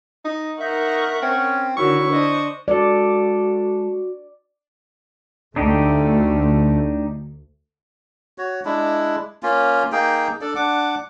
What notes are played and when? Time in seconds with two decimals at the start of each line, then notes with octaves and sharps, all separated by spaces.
0.25 D#4 D#5
0.61 D#4 A#4 E5 F#5 C#6
1.22 C4 C#4
1.77 D3 D#3 F#3 E4 C#6
2.09 D4 C5 D#5
2.68 G#3 F#4 A4 D5
5.56 D2 A3 D4 D#4 G4
8.38 F#4 C#5
8.65 G#3 D4 E4
9.43 A#3 C#4 F4
9.92 A#3 D#4 G#4 G5
10.41 D4 A4 D5
10.55 D4 F#5 D6